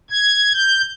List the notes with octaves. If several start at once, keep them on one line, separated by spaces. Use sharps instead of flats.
G#6
G6